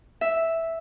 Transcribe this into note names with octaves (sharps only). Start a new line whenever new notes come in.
E5